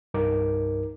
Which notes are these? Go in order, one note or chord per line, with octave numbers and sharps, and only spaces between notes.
C2 G2 D#4 A#4 D6